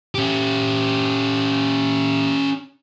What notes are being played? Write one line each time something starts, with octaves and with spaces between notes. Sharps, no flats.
C#4 G4